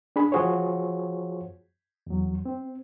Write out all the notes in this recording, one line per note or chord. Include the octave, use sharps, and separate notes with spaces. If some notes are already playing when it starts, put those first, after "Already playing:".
D4 G#4 B5
F3 F4 F#4 G#4 C5 C#5
E2 F#3
C4